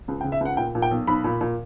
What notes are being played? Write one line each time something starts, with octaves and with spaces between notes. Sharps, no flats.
C#2
G5
C#3
E5
C#2 F#5
A#2 G5
A#2
G5
B1
B1 B5
A#2
A#2